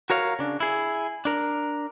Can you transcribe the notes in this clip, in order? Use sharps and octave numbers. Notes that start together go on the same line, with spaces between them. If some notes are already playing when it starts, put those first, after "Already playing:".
F#4 A#4 C#5 F5
C#3 D4
E4 G#4
D4 A#4